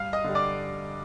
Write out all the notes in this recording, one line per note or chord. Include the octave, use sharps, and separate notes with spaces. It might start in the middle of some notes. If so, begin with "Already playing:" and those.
Already playing: G2 F5 F6
D#5 D#6
D3 G3
D5 D6